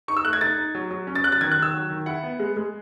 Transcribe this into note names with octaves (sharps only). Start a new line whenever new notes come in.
D#4 C#6
E6
A3 F#6
G#6
D#4 A6
D#4
F#3
F#3
C#4
A6
F#3 F#6
A6
D#3 G#6
F#6
D#3
E6
F#3
D#3
E4 F#5
B3
G#3
G#3